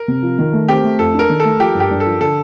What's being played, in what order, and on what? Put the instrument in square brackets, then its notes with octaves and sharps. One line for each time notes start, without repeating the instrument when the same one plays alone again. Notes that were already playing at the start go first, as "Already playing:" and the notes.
Already playing: [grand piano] A#4
[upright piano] C3
F3
D#3
A3
[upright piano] C4 [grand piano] G4
[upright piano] A3
[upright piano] F2 [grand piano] A4
[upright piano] D4 [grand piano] A#4
[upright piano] D#3
[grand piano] A4
[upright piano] A3
[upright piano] F3 [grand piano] G4
[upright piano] G2
[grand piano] G4
[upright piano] G2
[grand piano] A4
[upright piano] F3
[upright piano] D3 [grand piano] A4